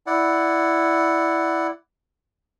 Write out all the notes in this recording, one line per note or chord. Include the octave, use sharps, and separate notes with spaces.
E4 D5 F#5